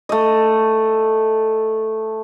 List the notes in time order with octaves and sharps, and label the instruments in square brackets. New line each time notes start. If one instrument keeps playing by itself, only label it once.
[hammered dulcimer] A3 D#5